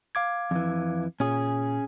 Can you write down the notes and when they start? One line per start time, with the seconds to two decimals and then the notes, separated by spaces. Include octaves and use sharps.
0.15 F5 D6 G#6
0.51 F2 E3
1.20 A#2 C#4 G#4